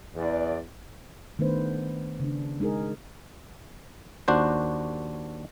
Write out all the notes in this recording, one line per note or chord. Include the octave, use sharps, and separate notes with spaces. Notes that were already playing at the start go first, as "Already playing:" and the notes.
E2 D5
D#3 A3 B3 D4 B4 C5
C#3 D4
G#3 D#4 G#4 A#4
D#2 D4 F#4 C5